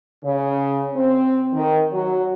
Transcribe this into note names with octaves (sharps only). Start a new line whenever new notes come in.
C#3
C4
D#3
F#3